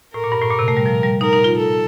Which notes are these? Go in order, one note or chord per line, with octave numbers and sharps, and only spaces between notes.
A2 A#4
A#2
G2
A2
A#2
C3
A3
G3
F3
G3
D#4 A#4
D#4
F4
A4